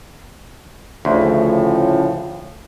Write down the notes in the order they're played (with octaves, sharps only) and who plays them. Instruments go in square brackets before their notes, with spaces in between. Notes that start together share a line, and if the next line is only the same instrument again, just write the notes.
[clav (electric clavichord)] D2 [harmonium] A2 C#3 F3